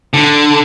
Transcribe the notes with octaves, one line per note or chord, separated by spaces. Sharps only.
D3